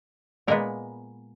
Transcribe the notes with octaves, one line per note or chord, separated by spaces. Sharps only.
A#2 G#3 A#3 B3 A#4